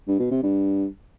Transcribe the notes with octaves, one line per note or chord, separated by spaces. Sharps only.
G2
B2
C3
G2